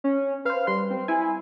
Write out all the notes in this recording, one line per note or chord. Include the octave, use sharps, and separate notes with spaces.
C#4
B4 C5 F5
G3 B4 C6
C4
E4 G#5